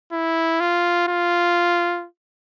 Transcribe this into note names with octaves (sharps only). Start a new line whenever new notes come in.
E4
F4
F4